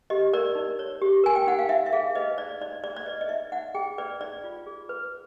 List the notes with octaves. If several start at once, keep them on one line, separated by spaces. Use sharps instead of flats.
G4 D#5
A#4 D5
D#4
C#5
G4
A#4 G#5
G5
D#4 F#5
F5
D#4 E5
E5
G#4 F5
B4 D#5
D#4 D5
D#4 D5
G#4 D5
D5
B4 D#5
D#5
D#4 E5
D#4 F#5
G#4 G5
B4 D5
D#4 D5
F4
G#4
B4